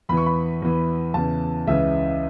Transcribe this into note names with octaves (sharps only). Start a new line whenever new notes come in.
E2 E3 B5
C#6
B5
E2 E3
E2 C#3 E3 A5
C#2 C#3 E3 E5